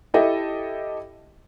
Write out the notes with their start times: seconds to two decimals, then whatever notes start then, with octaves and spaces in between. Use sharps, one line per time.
0.14 E4 G4 A4 D#5 E5